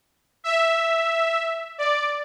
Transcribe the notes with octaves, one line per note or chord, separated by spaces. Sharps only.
E5
D5